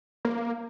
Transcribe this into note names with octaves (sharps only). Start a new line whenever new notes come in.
A#3